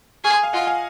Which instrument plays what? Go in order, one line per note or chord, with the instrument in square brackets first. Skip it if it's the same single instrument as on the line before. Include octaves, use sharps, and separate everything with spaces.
[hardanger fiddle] G#4 [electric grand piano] C#6 F6
[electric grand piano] C6 D#6
F5 G#5
[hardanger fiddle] F4 [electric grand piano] D#5 F#5
[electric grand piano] F5 G#5